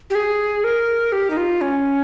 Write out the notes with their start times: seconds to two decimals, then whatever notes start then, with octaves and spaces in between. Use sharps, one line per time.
0.10 G4
0.15 G#4
0.64 A#4
1.12 G4
1.30 D#4
1.37 F4
1.61 C#4